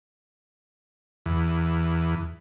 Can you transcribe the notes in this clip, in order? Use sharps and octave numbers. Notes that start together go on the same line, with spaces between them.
E2